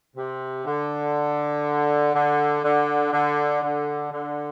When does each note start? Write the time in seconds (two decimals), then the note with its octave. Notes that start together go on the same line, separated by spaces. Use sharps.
0.15 C3
0.66 D3
2.14 D3
2.63 D3
3.12 D3
3.61 D3
4.11 D3